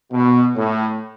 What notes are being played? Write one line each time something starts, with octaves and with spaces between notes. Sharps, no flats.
B2
A2